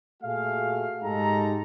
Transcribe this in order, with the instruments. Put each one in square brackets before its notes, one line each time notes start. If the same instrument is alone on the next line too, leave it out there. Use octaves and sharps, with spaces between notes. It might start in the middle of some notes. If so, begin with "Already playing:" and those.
[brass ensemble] A#2 A3 F#4 G#4 F5
G#2 G#3 D#4 G4 A4 A#5